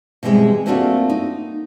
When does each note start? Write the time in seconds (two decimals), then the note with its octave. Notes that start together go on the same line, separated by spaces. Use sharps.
0.23 B2 E3 G3 G#3 C4
0.66 A3 A#3 C4 D4 F4 F#4
1.10 D#4